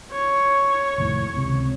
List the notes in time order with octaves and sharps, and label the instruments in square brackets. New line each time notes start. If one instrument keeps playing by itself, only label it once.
[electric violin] C#5
[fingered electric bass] F1 D#2 A2
C#2 C3